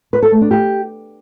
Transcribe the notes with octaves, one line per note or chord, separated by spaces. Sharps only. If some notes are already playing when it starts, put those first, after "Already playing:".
B4
A4
A3
D4
G4